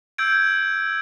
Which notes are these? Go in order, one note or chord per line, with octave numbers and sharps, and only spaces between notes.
E6 G6 G#6 D7